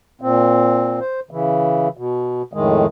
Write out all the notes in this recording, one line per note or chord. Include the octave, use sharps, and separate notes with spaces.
A#2 C4
C5
C#3 E3
B2
F2 A2 D#3 G#3